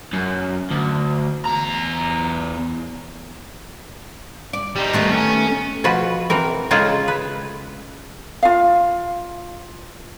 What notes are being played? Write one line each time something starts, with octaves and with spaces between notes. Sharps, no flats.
F#2
D2
E2 A#5
D5
G3 D#4
D#3 A3 B3
C#4
B2 F3 F#4 B4
E3 C4 A#4
C#3 G#3 D#4 F4 G#4 A4
B4
F4 F5